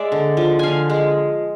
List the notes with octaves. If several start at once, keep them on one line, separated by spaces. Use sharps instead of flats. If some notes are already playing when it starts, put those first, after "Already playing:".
Already playing: G#3 D5 E5 G#5
D3
F3
D3 F5 G#5
G#3